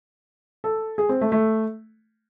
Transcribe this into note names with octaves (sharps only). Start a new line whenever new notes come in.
A4
G#4
C4
A3
A3